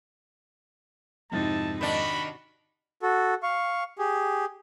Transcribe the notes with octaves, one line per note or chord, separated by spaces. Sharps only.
F2 G#2 C3 D#4 E4 A5 A6
D#3 D4 F#4 B5
F#4 A4
F5 C#6
G4 G#4